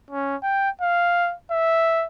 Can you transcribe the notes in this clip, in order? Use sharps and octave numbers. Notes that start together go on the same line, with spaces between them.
C#4
G5
F5
E5